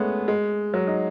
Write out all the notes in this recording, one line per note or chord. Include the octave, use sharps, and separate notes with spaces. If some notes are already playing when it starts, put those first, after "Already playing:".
Already playing: G#3 A3 B3 C#4
G#3
F#3
D#4